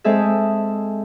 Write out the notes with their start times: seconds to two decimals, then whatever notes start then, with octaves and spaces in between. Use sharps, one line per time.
0.04 G#3 C4 G#4 A4 E5